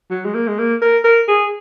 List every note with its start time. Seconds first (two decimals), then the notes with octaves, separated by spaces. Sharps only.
0.11 F#3
0.25 G#3
0.34 A#3
0.48 G#3
0.58 A#3
0.82 A#4
1.05 A#4
1.28 G#4